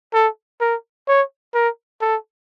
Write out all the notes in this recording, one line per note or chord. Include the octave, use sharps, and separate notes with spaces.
A4
A#4
C#5
A#4
A4